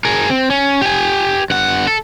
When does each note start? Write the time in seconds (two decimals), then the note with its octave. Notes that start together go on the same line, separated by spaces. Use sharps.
0.05 G#4 A#4
0.30 C4
0.50 C#4
0.81 G4 G#5
1.50 G2 F#5
1.87 A4